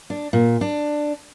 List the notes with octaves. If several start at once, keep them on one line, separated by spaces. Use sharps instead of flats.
D4
A#2
D4